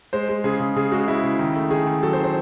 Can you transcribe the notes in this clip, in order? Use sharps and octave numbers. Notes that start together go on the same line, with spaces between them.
G#3 C5
G#3
C#3 G#4
C#3
C#3 G#4
G#3 F#4
G#3 E4
C#3
D#3
A3
D#3 G#4
D#3
F#3 A4
C5
D#3
C5